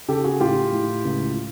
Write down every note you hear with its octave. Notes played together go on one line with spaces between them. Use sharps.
C#3 G4 A4
F#4 G#4
A2 F4 G4
A2
C#2